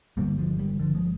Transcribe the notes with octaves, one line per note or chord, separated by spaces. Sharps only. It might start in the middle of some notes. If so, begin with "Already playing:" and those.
G1 G2 D3 G3 A#3
F3 G#3
D#3 G3
D3 F3
F3 G#3